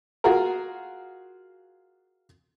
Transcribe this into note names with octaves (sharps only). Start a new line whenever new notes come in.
F4 F#4 G#4 A#4